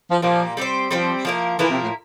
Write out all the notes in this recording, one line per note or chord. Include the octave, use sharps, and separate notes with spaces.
F3
A#2 F3 G3 A#3
G3 C4 G4 C5
F3 G3 C4 G4 C5
F3 A#3 E4 A#4
E3 F3 A#3 E4 A#4
C3
A2